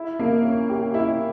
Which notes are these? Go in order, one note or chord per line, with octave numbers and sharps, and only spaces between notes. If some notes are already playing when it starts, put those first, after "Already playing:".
Already playing: E4
A#3
C#4
G4
E4